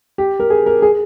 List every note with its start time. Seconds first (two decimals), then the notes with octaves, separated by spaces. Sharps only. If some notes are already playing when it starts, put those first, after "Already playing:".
0.18 G4
0.40 A#4
0.50 G#4
0.66 A#4
0.82 G#4